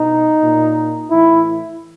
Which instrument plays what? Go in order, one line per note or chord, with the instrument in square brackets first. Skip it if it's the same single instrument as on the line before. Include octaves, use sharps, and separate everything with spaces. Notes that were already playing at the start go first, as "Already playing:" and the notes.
Already playing: [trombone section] B2 D#4
A#2
A2 E3 E4